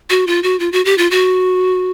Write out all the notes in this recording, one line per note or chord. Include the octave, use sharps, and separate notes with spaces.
F#4
F4
F#4
F4
F#4
G4
F4
F#4